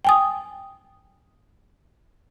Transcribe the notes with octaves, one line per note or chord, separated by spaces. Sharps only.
G5 G#5 D#6